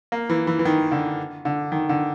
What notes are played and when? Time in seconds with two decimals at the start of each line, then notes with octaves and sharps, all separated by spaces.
0.12 A#3
0.29 E3
0.47 E3
0.59 E3
0.65 D#3
0.92 D3
1.45 D3
1.72 D#3
1.89 D3